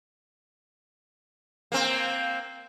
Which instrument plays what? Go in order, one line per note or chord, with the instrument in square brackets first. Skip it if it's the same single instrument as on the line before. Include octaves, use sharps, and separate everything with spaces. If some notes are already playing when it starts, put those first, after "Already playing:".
[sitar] A#3 C4